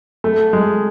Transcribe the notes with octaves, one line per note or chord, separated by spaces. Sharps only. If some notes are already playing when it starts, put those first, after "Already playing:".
A3
G#3